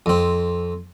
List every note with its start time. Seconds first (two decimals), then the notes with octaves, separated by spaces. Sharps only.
0.06 F2 C4